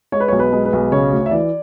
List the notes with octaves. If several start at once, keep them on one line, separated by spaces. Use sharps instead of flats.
G#3 C#5
B4
B1 C#5
B4
G#3
B4
B1
C#3 C#5
D2
E5
E3 D5